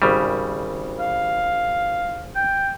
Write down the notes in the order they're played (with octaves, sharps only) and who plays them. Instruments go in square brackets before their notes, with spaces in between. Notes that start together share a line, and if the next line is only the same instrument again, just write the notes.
[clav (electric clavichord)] G#1 C#3 G3
[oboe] F5
G5